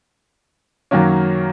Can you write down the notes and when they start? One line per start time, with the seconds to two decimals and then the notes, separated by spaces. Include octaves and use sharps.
0.91 F#2 D#3 F#3 A#3 C#4